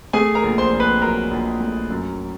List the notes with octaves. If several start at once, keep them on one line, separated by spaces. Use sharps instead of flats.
A3 G#4 G#5
A#4 A#5
A#1
C5 C6
A#1
B4 B5
F#3 A#4 A#5
A#1
A3
F#2